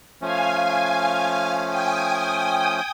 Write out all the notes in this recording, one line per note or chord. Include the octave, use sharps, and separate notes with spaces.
F3 A3 C#4 F5 G#5
G5 G#5 D#6